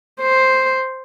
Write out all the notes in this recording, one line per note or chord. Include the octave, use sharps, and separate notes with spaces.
C5